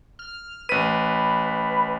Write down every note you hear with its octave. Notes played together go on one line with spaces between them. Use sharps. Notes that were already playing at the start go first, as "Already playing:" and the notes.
F6
A1 B4 D#7